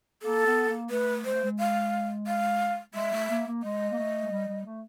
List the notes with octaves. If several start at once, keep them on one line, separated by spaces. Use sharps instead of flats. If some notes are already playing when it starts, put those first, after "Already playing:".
A#3 A4
B3
A#3
A3 B4
G#3 C5
A3
G#3
F5
F5
G#3 E5
A3
A#3
A#3
G#3 D#5
A#3
A3
G#3
G3
G3
A3